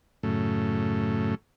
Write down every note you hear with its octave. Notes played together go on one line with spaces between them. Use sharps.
F#2 A2 C#3 A3